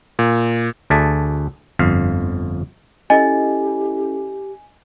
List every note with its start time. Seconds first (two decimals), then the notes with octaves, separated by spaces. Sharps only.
0.19 A#2
0.90 D2 G#4 A4 D5 E5
1.79 G1 F2 F5
3.10 C#4 E4 G4 A4 D#5 G#5